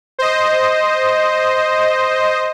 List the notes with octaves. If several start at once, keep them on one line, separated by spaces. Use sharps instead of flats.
C5 D#5